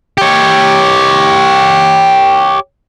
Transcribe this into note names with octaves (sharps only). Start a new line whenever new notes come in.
G4 C#5